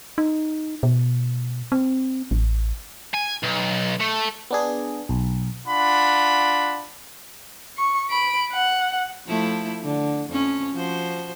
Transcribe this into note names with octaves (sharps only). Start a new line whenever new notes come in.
D#4
B2
C4
A1
G#5
B1
A3
B3 D4 G#4
B1
D4 F4 F#5 B5
C#6
B5 D7
F#5
F3 A3 E4
D3
F2 F3 C#4
F3 F#4 C5